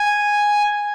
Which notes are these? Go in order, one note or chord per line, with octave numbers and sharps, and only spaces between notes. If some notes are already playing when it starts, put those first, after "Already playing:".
Already playing: G#5